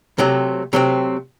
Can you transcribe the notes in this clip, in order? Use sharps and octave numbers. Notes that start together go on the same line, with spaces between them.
C3 F#3 A3 C4
C3 F#3 A3 C4